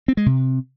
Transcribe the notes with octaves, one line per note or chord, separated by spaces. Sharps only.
C4
G#3
C3